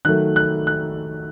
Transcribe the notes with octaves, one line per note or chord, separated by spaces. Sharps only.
D#3 F#3 A3 F#6
F#6
F#6